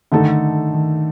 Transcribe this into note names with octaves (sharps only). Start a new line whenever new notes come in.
D3 D#3 A3 D#4 A4
D#3